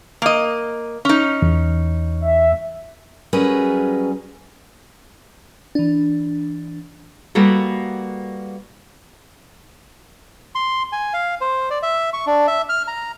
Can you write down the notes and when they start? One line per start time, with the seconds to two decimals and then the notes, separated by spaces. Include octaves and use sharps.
0.22 A#3 D#5
1.05 C#4 D#4
1.42 E2
2.21 E5
3.33 F#3 G3 C#4 G#4 A#4 B4
5.75 E3 D4
7.35 G3 A#3 B3 F#4 A4
10.55 C6
10.92 G#5
11.13 F5
11.41 C5
11.70 D5
11.83 E5
12.13 C#6
12.26 D4
12.48 E5
12.69 F6
12.88 A#5